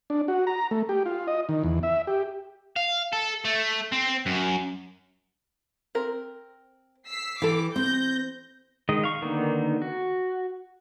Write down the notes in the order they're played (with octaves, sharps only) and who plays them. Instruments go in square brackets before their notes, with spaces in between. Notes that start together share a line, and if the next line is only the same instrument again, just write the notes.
[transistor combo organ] D4
F#4
A#5
A3
G4
F4
D#5
D#3
E2
E5
G4
[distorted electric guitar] F5
A4
A3
C4
F#2
[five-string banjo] C4 A#4
[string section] E6 B6 C7
[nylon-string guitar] E3 [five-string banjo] G4 A4 [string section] D6
[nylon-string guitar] C4 [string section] G6 A#6
[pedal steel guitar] D#3 G#3 D#5
F5 C#6
D3 D#3 A#3 B3 D#4
F#4